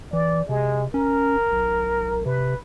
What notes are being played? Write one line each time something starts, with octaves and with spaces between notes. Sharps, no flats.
E3 D5
C3 G#3
C#4 A#4
B1
C3 B4